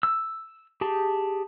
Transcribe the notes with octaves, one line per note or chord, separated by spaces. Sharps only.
E6
G4 G#4 A5